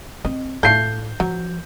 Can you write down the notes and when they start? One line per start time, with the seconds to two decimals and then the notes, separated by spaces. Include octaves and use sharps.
0.25 C4 D#5
0.63 A2 A3 F4 A4 G6 C7
1.20 F3 F#3